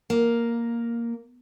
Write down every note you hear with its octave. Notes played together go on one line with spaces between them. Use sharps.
A#3